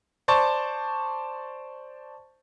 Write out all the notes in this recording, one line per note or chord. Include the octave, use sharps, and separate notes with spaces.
C5 D5 A5 C#6